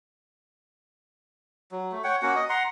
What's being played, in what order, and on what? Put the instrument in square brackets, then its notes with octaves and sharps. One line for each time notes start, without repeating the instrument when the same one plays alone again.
[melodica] F#3
A3
C#5 F#5 G5
A#3 C#4 F#4 F#5
D#5
F#5 A#5 C6